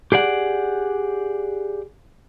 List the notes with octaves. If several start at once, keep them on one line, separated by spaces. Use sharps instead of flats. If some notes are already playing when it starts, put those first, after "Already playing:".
G4 G#4 D5 F#5